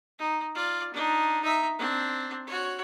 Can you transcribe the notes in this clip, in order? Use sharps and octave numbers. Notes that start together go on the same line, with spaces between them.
D#4
F4 D5
D4 D#4
D#4 E5
C4 D4
F#4 C#5